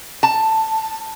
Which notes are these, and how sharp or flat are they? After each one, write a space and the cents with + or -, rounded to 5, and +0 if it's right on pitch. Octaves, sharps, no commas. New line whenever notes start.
A5 +10